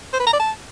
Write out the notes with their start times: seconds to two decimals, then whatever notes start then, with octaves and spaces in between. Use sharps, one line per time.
0.13 C5
0.20 B4
0.26 A#5
0.33 D5
0.40 A5